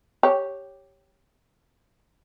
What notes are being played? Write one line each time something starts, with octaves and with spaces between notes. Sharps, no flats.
G4 C#5